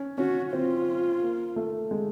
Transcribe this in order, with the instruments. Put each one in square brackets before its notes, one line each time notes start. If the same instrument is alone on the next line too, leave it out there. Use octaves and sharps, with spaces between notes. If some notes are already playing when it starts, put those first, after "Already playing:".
Already playing: [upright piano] C#4
[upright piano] C#4 [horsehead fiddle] F#4
[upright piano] C4 [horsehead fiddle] F4
[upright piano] A#3
A3
G#3